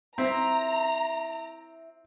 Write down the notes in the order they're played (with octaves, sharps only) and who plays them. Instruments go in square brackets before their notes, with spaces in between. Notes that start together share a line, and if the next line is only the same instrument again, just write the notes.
[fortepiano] C4 [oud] E4 E5 [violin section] A#5